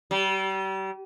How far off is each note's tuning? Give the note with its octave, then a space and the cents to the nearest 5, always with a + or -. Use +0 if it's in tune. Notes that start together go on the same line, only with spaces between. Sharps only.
G3 -35